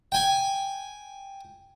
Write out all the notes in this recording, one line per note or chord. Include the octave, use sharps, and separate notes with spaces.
G5 G#5